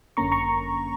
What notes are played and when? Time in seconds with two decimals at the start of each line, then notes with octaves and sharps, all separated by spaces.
0.17 G1 F#2 D3 A#3 C#4 A#5 C#6
0.32 A#5 C#6